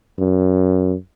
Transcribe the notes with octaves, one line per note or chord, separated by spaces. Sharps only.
F#2